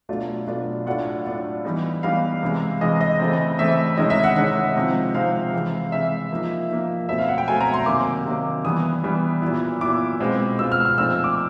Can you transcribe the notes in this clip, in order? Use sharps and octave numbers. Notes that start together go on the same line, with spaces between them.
B2 F#3 A3 D4 F4
B2 F#3 A3 D4 F4
A2 F#3 A3 D4 F4 F#5
A2 F#3 A3 D4 F4
E3 G3 B3 D#4
E3 G3 B3 D#4 F5
C3 E3 G#3
C3 E3 G#3 D#5
D#5
C#3 E3 A3 C4
C#3 E3 A3 C4 E5
C3 D#3 G#3 C#4 E4 D#5
E5
F#5
C3 D#3 G#3 C#4 E4 F#5
C3 F3 G#3 C4 D#4
C3 F3 G#3 C4 D#4 F5
C3 E3 G#3
C3 E3 G#3 E5
F3 A#3 D#4
F3 A#3 D#4
B2 F#3 A3 C4 E5
F5
F#5
G5
B2 F#3 A3 C4 G#5
A#5
C6
C3 D#3 F#3 A#3 D6
C3 D#3 F#3 A#3
E3 G3 B3 D#6
E3 G3 B3
A#2 F#3 B3 E4
A#2 F#3 B3 E4 D6
B2 G#3 C4 F4
B2 G#3 C4 F4 E6
F6
F6
A#2 F3 A3 C4 D#4 E6
D6